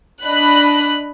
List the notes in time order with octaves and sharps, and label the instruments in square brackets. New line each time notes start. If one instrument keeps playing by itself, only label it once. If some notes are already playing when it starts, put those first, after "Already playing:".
[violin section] D4 D#5 B5 F#6